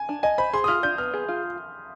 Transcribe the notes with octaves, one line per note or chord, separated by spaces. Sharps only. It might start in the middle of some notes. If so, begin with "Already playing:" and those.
Already playing: G#5
D4
D#5 G#5
C5 B5
G#4 C6
D#6
F4 F6
D4 G6
B3 F6
G#4
F4